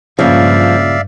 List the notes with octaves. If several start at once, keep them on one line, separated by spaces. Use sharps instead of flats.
C#2 G2 A#2 C#3 F3 D5 E5 F5